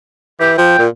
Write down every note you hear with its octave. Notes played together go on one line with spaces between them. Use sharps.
E3 G4
F3 G5
A#2